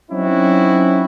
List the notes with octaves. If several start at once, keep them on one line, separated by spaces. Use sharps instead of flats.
F#3 C4 C#4 D#4 E4 F#4